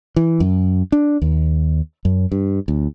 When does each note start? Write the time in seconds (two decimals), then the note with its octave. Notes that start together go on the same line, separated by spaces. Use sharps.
0.16 E3
0.40 F#2
0.92 D4
1.22 D#2
2.05 F#2
2.32 G2
2.68 D2